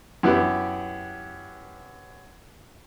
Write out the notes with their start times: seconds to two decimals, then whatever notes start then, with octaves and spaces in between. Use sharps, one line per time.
0.23 F#2 B3 E4 G4 B4